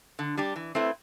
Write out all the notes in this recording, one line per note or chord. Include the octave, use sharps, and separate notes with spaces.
D3
G3 D4 G4
E3
A3 C4 E4 B4